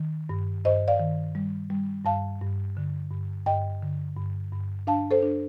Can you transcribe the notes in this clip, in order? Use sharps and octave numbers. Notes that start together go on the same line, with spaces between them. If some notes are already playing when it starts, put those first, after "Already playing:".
Already playing: D#3
G2
G2 C5 D#5
D5 F5
D#3
G3
G3
G2 F5 A5
G2
D3
G2
G2 D#5 G5
D3
G2
G2
D4 F5 A5
A4 C5
D4